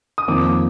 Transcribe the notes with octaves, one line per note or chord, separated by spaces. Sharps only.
D#6
F2 D#3 A#3 D6